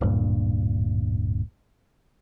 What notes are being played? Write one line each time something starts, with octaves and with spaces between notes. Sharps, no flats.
D1 G2 A#2